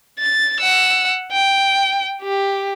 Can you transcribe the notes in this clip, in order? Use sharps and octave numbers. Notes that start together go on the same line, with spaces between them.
A6
F#5 E6
G5
G4